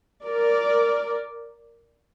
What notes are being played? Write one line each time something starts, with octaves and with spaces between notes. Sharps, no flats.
A#4 D5